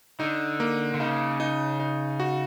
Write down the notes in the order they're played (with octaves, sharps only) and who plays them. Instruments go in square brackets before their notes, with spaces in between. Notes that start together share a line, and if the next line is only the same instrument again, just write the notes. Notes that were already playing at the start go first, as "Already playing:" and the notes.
[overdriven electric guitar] D3 [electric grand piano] D#4
[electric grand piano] A#3
[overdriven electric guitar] D3
[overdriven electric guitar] C#3 [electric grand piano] D#4
[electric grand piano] D#4
D#4
F#4